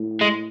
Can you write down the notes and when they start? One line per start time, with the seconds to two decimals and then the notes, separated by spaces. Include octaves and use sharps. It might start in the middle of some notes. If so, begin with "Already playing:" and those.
Already playing: A2
0.21 G#3